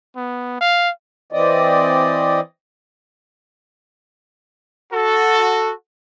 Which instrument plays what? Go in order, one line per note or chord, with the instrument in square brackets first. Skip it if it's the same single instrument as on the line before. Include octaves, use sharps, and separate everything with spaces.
[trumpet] B3
F5
[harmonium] E3 C4 D5 D#5
[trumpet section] F#4 A4